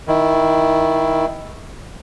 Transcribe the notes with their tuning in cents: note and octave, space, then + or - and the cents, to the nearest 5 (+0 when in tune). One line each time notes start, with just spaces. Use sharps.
D#3 +20 E4 +0